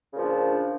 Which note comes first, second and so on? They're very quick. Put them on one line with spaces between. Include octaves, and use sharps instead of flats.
C#3 A#2 F3 D4